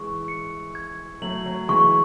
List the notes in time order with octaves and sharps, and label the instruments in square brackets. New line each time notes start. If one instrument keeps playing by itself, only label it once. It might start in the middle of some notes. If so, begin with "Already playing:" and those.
Already playing: [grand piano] E3 G#3 [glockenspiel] C#6
[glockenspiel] C#7
G#6
[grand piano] F#3 A3 [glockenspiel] F#7
[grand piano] F#3
[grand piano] E3 G#3 [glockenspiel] C#6